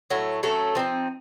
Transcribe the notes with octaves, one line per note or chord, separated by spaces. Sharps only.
A2 F#3 A3
F#3 A3 C#4 A4
F3 C4 D#4